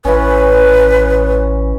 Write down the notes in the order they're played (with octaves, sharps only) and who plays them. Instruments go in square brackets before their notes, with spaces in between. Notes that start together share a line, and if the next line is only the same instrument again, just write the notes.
[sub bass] A1 [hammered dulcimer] E3 C#4 [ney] B4